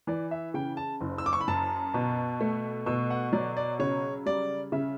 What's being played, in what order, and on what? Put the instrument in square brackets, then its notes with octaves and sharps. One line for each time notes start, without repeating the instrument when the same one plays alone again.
[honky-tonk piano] E3 [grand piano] D5
[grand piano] E5
[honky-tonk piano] C#3 [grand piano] G5
[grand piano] A5
[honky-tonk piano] F#1
[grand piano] E6
D6
C#6
B5
[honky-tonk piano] F#2 [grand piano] A5
[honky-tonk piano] B2
A3
[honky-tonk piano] B2 [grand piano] E6
[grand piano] F#5
[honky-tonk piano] F#3 [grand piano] D5
[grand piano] D5
[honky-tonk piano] C#3 [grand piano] C#5
[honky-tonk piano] G3 [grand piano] D5
[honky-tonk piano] C#3 [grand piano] E5